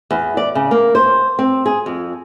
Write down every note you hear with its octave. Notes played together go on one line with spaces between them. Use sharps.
E2
D5
C#3
A#3
C5
C4
G#4
F2